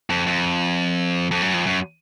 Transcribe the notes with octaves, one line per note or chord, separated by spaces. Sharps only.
F2
F2
F2
F#2
F2
F#2